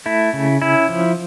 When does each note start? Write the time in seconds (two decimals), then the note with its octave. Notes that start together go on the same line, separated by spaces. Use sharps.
0.06 A3 E4
0.33 C#3
0.61 C#4 E4
0.89 F3